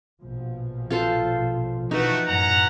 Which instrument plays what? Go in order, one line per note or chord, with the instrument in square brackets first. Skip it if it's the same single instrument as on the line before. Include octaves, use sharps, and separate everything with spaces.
[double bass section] A#1 B2 F3
[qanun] F4 A4 C5
[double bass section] B2 E3 F3 [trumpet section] A3 F#4 [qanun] D#4 B4
[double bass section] F#2 A2 [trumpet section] C#4 F#5 A#5